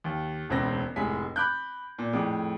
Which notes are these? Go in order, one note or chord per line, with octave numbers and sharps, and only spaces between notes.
D#2
E1 C#2 C4 A#6
F1 A2 G#3 G#5 B6
B5 D6 F#6 G6
A#2
F2 A2 G#4 D6